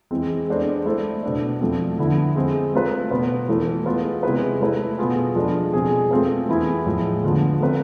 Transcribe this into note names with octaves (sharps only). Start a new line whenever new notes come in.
E3 G#3 C4
G#3 B3 D4 A4 C5
A3 E4 A4 C5
B2 B3 D4
F3 A3 C4
D3 F3 B3 E4
G#3 C4 G#4 C5
A3 C4 F4 B4
B2 B3 F4 B4
E3 A3 E4 B4
G#3 B3 F4 B4
C3 G#3 B3 E4 B4
A3 E4 B4
B2 B3 F4 G#4
F3 G#3 D4 A4
B2 G#3 C4 G#4 C5
A3 C4 F4 B4
E3 B3 E4 G#4
A2 F3 G#3
D3 F3 B3 F4
A3 C4 F4 B4